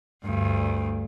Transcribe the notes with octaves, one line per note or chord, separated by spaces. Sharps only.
D2 G2